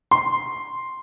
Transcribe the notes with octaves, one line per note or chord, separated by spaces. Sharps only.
C6